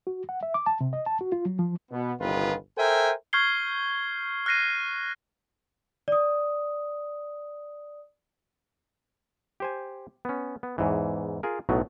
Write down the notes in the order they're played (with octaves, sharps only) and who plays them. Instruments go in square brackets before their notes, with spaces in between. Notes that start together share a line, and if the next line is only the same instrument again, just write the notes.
[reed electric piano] F#4
F#5
E5
D6
A5
C3
D#5
A5
F#4
F4
F#3
F3
[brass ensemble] B2 B3
G1 C2 D#3 B3 F4 B4
A4 A#4 C5 E5 G5 G#5
[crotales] C#6 F6 G6 G#6 C7 G7
F6 F#6 A#6 C7 D#7
[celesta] D5 D#6
[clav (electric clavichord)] G4 C5 G#5
B3 C#4
B3
E2 G#2 E3
F4 G#4 A#4
B1 A2 F#3 B3